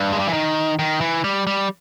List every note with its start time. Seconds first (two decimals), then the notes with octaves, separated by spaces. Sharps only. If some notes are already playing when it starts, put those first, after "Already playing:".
Already playing: G2
0.12 G#3
0.19 G3
0.27 E3
0.33 D#3
0.79 D#3
1.01 E3
1.24 G3
1.47 G3